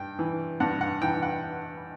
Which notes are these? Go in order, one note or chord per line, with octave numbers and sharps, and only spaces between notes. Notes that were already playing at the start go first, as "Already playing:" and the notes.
Already playing: G2 G5
E3
G2 F#5
F#5
E3 G5
F#5